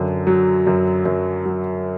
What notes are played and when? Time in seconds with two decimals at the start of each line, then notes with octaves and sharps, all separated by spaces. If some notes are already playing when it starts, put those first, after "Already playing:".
Already playing: F#2 D3
0.27 F#3
0.67 F#2
1.05 F#2
1.45 F#3